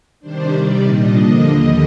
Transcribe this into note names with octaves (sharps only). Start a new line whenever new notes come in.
C3 D#3 G3 D4 C5
C3 D#3 G3 D5
A#2 G3 D4 D#5
D3 F3 A#3 D4 D#5
D#2 D3 G3